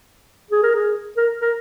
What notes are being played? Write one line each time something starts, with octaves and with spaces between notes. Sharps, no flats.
G#4
A#4
G#4
A#4
A#4